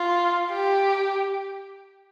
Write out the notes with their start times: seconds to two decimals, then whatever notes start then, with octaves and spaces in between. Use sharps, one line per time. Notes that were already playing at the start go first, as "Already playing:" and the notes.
Already playing: F4
0.52 G4